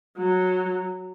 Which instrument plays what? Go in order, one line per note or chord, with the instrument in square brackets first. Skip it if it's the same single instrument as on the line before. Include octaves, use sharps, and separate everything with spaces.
[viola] F#3